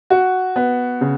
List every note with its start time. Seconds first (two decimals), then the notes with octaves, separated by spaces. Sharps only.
0.10 F#4
0.56 B3
1.01 C#3